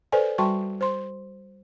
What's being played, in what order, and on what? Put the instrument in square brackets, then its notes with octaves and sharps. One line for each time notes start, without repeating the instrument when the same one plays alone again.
[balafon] A4 B4 C5 D5 G#5
G3 F#4 G5 A5 C6 C#6
C5 C6